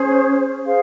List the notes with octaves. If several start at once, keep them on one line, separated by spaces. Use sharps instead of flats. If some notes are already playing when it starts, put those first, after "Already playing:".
Already playing: C#4 G#4 C5
G#4 C5 F5